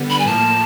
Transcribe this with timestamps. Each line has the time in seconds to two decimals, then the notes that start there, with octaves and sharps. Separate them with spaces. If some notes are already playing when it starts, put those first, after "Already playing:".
Already playing: D3 G3 B3
0.10 B5
0.19 G#5
0.26 A2 F3 A#3 A5